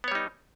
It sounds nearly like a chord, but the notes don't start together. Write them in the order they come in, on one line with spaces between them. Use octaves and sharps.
B3 C#5 G3 D#4